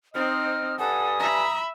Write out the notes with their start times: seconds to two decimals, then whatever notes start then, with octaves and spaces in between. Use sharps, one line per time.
0.15 C4 D#4 C5 D#5 F6
0.79 G2 A4 F#5 G#5 D#6
1.20 E5 A#5 B5